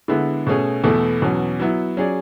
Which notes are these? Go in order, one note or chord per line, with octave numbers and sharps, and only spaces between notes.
D3 G#3 B3 E4
B2 A3 C#4 G#4
E2 B2 A3 E4 A4
E2 B2 F#3 C#4
F#3 B3 E4
F#3 C#4 G#4 D5